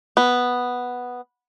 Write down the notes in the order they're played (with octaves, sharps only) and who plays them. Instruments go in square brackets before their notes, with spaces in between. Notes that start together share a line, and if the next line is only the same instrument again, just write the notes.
[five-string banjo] B3